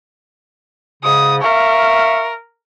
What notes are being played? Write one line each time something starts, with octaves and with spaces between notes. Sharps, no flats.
G#2 C#3 D#6
A#4 E5 F5 C#6